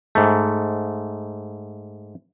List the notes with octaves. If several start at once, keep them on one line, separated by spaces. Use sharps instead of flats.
G#2 A3